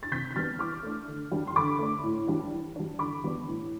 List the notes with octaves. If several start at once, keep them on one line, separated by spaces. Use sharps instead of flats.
A6
C3 G6 B6
B6
G3 B3 D4 F6 A6
E3 D6 F6
A3 D4
D3
G3 D4
C6
D3 B5 D6
A3 D4
A2
E3 G3 D4
E3
G3 D4
D3 B5 D6
G3 B3 D4
A2